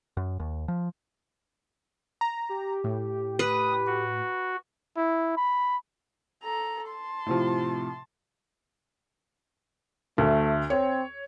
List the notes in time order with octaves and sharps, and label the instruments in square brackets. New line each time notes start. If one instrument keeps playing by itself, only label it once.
[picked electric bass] F#2
D#2
F3
[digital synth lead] A#5
[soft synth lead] G4
[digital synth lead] A2
[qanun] B4 [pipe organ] D#6
[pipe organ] F#4
[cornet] E4
B5
[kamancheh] A4 A#5
A5 C6
[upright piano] A2 C3 F3
[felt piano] D2 [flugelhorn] A3
[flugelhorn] C4 [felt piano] C#5